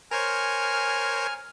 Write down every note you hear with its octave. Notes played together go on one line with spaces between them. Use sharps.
A#4 C5 C#5 G#5 F6